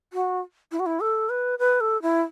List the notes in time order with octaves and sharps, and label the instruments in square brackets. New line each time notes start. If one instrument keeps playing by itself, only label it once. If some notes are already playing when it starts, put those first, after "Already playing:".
[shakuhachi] F#4
E4
F#4
E4
A4
B4
B4
A4
E4